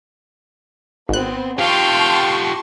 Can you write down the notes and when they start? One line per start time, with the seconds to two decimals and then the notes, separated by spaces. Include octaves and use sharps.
1.09 G#1 B3 C4 F#6
1.59 F4 G4 F5 G5 A5 C6 C#6